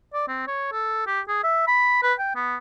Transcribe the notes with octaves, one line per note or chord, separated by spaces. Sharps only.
D5
C4
C#5
A4
G4
G#4
E5
B5
B4
G5
B3